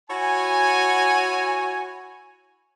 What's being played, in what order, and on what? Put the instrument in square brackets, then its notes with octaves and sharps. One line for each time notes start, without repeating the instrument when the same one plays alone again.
[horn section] E4 F#4 C#5 G#5